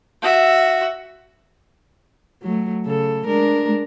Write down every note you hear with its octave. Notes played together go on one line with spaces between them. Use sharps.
F#4 E5
F#3 A3
C#3 A4
G#3 D4 A#4